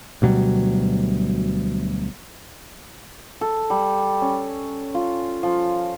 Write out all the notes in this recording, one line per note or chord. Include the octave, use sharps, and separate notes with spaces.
D2 B2 F#3 G3
A4
G3
C#4
F4
F3